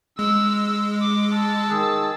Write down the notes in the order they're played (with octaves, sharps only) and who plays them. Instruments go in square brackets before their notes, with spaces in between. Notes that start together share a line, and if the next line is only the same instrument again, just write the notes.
[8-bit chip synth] G#3 [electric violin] E6
[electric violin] D6
A5 E6
[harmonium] D#3 G#4